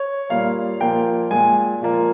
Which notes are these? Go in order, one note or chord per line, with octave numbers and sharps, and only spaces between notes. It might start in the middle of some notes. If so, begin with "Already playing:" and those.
Already playing: C#5
A#2 G3 A#3 F5
A#2 F3 A#3 G5
A#2 G#3 G#5
A#2 F3 A#3